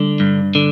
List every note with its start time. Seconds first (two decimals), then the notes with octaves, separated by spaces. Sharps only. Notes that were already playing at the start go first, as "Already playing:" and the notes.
Already playing: D3 G3
0.20 G2
0.55 D3